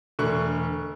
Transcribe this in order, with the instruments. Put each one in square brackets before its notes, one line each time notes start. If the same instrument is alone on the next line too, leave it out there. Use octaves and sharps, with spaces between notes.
[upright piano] E1 D3 A3 C#6 F#6